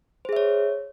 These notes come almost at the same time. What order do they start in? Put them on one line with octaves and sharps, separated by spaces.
C5 G#4 E5 C#5